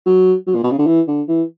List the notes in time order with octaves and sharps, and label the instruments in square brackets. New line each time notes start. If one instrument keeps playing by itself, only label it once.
[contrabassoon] F#3
F#3
A#2
B2
C#3
D3
E3
D3
E3